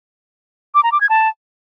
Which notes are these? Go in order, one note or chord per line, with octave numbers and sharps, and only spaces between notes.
D6
A#5
D6
G#6
A5